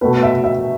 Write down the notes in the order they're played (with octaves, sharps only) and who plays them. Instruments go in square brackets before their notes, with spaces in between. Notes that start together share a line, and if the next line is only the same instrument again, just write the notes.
[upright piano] B2 A3 B4
E5
E5